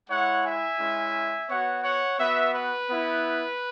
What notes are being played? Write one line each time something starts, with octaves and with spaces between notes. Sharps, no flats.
G#3 E4 C#5 F#5
E5 G#5
G#3 C#4 E4
B3 F#4 C#5 F#5
C#5 F#5
B3 F#4 B4 E5
B4
B3 E4